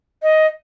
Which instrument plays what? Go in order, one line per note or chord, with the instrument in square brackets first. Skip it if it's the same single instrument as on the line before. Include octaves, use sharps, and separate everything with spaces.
[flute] D#5